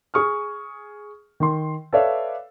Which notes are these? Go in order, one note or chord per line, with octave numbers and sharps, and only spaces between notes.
G#4 C#6 D#6 F6
D#3 C6
A4 B4 C#5 D5 E5 F5